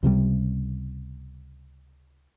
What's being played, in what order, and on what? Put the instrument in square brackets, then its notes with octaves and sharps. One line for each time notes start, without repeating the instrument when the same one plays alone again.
[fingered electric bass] C#2 C3 E3 G3